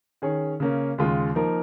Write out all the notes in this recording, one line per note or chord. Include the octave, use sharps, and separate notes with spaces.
D#3 C#4 G#4 C#5
C#3 A#3 C#4
D#2 C#3 G#3 F4
F3 A#3 D#4 A#4